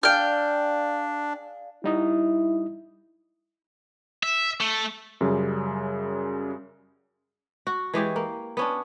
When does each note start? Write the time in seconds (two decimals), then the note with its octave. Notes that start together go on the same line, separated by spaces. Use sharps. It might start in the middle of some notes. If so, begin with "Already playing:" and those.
0.03 D4 G#4 D5 F5 G5 F6
1.84 G3 D#4 E4 D#6
4.23 E5
4.61 A3
5.21 F#2 C#3 G3
7.67 F#4
7.94 E3 G#3 G4 C#5
8.16 A#3
8.57 B3 C#4 D4